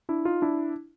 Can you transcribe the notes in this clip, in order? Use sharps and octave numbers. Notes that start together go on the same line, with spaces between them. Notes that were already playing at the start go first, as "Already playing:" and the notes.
D4 E4
D#4 F4
D4 E4